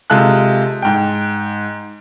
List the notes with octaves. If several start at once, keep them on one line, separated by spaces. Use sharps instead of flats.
C3 G#3 F4 A4 F#6
G#2 G5